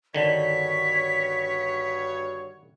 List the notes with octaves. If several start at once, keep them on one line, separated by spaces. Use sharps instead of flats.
G2 D3 D#3 F#4 C#5 B6